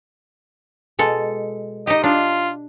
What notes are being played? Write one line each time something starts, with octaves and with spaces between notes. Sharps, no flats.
B2 G#3 A4
D#4 G4 D#5
D4 F4